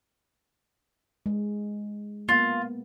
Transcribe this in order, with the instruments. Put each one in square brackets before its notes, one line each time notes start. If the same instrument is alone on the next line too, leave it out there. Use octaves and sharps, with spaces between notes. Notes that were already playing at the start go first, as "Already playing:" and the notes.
[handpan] G#3
[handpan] A#3 B3 [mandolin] F4